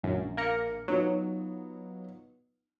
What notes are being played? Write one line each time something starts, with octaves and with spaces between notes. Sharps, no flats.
A#1 F#2
A#3 A#4 C#7
F#3 B3 D#4 F4